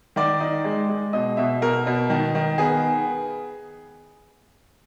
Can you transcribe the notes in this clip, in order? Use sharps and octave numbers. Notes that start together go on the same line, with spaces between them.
D#3 D5
D#4
G#3
G#3
B2 D#5
B2 E5
B2 A#4
B2
D#3
D#3
B3 G#4